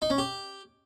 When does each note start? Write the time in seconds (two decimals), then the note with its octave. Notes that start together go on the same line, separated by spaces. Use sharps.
0.02 D#4
0.10 C#4
0.18 G4